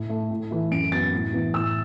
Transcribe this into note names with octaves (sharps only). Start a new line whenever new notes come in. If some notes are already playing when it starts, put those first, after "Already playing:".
Already playing: A2
A3
A2
E3 A3
F#2 D7
F#3 B3 A6
A2
E3 B3
A2 E6